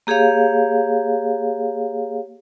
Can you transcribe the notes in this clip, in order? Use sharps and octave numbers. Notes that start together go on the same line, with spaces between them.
A#3 G4 G#4 C#5 F5